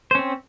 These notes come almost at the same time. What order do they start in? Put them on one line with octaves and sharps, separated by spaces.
C5 C#4 C4